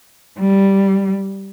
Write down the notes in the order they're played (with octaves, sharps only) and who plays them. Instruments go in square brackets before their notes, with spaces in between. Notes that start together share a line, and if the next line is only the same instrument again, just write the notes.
[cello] G3